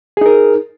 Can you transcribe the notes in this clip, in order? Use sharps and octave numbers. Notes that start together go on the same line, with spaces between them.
D#4 G#4 A#4